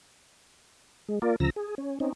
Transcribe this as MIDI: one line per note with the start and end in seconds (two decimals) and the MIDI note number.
1.09 1.19 56
1.22 1.36 58
1.22 1.36 65
1.22 1.36 70
1.22 1.36 74
1.40 1.50 38
1.40 1.50 49
1.40 1.50 53
1.40 1.50 82
1.40 1.50 88
1.40 1.50 94
1.56 1.75 68
1.78 1.99 61
2.00 2.13 60
2.00 2.13 61
2.00 2.13 63